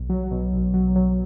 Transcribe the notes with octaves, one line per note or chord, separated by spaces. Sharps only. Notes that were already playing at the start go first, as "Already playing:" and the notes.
Already playing: B1
F#3
B2
B1
F#3
F#3